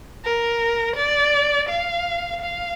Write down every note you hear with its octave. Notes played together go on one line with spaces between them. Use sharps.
A#4
D5
F5
F5